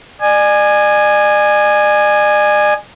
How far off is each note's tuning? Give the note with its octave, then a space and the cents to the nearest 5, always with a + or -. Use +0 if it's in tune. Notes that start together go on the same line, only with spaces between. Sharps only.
D5 +45 G#5 +0